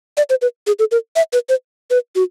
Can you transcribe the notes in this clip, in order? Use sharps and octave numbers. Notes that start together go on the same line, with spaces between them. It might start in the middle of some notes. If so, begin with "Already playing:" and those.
D5
C5
B4
G#4
A4
A#4
E5
B4
C5
B4
F#4